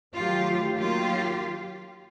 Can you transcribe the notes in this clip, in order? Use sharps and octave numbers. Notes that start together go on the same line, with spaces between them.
D#3 F#3 A3 F4 G4
D#3 F#3 A#3 F4 G4